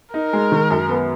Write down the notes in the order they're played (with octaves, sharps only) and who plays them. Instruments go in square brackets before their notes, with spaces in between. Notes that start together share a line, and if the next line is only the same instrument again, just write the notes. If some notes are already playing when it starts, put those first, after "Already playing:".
[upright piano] D#4 [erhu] A#4
[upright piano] G#3
D#3
F#2
B3